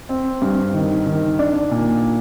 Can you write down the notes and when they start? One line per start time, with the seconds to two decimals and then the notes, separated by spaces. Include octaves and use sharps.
0.09 C4
0.42 G2
0.74 D#3
1.06 D#3
1.39 D4
1.71 A#2